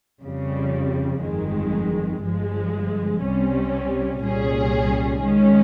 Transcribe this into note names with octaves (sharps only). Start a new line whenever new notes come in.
F2 C#3 G3
G1 F2 D#3 G#3
G1 G2 F3 G#3
C2 C3 G3 C#4
C2 A#2 G3 C#4 G#4
D#3 G#3 C#4